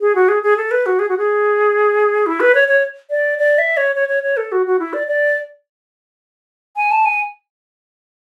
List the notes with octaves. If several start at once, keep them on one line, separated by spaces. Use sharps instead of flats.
G#4
F#4
G#4
G#4
A4
B4
F#4
G#4
F#4
G#4
E4
B4
C#5
C#5
D5
D5
E5
C#5
C#5
C#5
C#5
A4
F#4
F#4
E4
D5
D5
G#5
A5
G#5